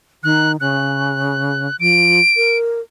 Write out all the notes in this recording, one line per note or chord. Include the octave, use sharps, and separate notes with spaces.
D#3 F#6
C#3 F#6
F3 D7
A#4